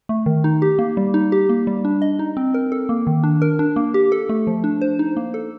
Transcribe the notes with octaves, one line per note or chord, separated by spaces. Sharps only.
A3
D#3
D#4
G4
A#3
G3
D#4
G4
A#3
G3
D4
D#5
D#4
C4
A#4
A4
A#3
D#3
D4
A#4
D4
A#3
G4
A4
A3
F3
D4
C5
D#4
A#3
A4